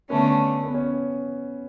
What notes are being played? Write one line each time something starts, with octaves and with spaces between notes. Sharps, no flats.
D3 A3 B3 C#4
B3
C#4